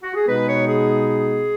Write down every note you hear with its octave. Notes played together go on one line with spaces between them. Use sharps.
F#4
G#4
B2 G#3 B3 D#4 B4
C#5
G#4